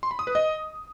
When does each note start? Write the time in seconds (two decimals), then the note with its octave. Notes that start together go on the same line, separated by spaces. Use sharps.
0.03 C6
0.11 B5
0.19 D#6
0.27 B4
0.35 D#5